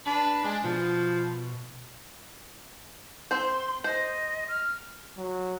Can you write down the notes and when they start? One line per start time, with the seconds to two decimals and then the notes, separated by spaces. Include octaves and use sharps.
0.07 D4 B4
0.44 G#3 D4
0.64 B2 F3
3.31 C4 C5 C6
3.84 C5 D#5
4.49 F6
5.17 F#3